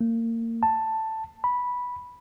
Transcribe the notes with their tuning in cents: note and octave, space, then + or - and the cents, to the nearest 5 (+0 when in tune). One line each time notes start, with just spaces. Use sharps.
A#3 -30
A5 +5
B5 -10